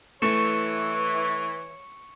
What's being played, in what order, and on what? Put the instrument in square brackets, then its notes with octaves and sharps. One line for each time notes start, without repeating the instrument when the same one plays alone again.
[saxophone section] E3 [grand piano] A3 [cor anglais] C#5 [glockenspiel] C#6 C#7 E7